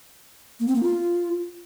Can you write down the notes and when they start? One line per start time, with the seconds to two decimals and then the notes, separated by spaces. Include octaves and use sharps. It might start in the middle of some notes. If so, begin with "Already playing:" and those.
0.60 A#3
0.67 C4
0.75 A#3
0.83 F4